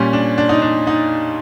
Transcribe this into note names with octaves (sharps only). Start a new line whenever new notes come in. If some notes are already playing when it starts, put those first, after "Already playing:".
Already playing: A#2 G3 C#4
D4
D4
D#4
D4
D#4